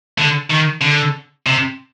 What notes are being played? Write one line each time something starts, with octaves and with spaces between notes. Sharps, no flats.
D3
D#3
D3
C3